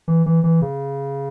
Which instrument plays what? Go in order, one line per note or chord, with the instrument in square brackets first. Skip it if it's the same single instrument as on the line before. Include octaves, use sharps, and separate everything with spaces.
[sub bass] E3
E3
E3
C#3